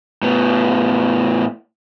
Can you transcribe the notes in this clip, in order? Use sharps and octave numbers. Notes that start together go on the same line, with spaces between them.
A2 B3